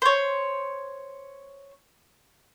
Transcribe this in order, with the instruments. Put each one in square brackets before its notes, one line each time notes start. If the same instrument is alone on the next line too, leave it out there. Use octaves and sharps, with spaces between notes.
[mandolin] C5 C#5